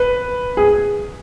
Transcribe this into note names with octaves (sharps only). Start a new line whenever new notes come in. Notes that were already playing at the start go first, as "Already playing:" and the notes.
Already playing: B4
G#4